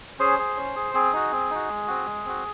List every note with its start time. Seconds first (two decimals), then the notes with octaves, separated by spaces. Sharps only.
0.19 C#4 G#4 C5
0.39 G#4
0.57 C#4
0.76 G#4
0.94 C4 G#4
1.13 D#4 F#4
1.32 C4
1.50 D#4 F#4
1.69 G#3
1.87 C4 F#4
2.06 G#3
2.25 C4 F#4